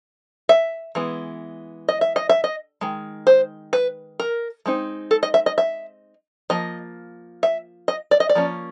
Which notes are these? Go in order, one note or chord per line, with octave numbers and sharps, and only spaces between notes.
E5
E3 G#3 B3
D#5
E5
D#5
E5
D#5
D#3 G#3
C5
B4
A#4
G#3 C4 D#4
A4
D#5
E5
D#5
E5
F3 A#3 D#5
E5
D#5
D5
D#5
D5
F3 A#3 C#4